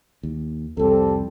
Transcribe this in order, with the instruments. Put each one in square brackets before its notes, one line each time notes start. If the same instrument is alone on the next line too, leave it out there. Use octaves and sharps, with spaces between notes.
[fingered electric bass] D#2
[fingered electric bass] C2 F2 [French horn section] G3 C4 A4